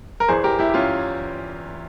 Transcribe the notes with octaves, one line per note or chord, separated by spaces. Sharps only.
A#4
E2 E3 G#4 C5
G4 A#4
E4 G4
G4
C#4 F4